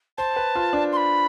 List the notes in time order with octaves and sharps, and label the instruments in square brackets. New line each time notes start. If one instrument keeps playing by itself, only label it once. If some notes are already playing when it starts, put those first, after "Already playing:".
[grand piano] C5 [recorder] A5
[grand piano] B4
F4
D4
[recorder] C6
B5